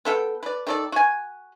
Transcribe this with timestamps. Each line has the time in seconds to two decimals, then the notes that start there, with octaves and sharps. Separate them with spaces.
0.05 B3 A4 F5 G5
0.43 B4 D5
0.67 D#3 A4 D5
0.92 F#4 G#5